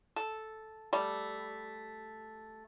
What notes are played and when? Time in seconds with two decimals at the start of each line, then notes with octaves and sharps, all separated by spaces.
0.16 A4
0.93 G3 A3